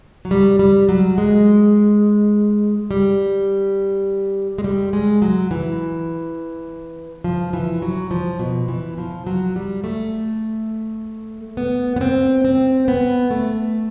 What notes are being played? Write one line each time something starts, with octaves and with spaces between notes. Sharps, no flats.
F#3
G3
G3
F#3
G#3
G3
G#3
G3
G#3
F#3
E3
F3
E3
F#3
F3
B2
E3
F3
F#3
G3
A3
B3
B3
C4
C4
B3
A3